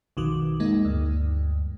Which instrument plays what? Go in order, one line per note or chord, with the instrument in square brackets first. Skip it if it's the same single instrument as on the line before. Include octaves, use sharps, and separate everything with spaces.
[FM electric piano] B1 F2 D#3 F#4 D6
G#3 A#3 D#4
D2 G2